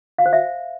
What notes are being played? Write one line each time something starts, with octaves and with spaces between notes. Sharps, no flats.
F5
C5
E5